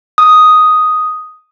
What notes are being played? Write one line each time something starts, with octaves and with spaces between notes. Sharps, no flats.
D#6